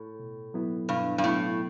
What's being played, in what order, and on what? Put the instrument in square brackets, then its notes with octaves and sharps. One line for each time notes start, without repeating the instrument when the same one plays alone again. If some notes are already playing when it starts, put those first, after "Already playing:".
Already playing: [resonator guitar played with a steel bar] A2
[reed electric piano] B2
F#3 B3 E4
[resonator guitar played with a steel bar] G2 [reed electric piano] B2
[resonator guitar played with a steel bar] G2
[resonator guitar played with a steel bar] A2 [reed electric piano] F#3 B3 E4